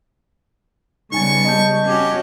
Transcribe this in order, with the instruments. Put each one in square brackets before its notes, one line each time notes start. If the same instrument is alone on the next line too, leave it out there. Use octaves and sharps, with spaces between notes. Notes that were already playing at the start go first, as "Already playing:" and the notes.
[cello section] C#3 G3 B3 [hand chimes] D#4 G#5 A6 [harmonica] C#6
[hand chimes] D#5 A5 G6
[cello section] C#4 F#4 [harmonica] G4